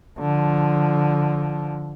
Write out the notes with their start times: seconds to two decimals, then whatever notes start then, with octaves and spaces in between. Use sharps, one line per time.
0.19 D3 F3